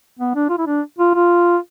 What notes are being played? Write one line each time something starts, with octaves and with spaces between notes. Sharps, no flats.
B3
D4
F4
E4
D4
F4
F4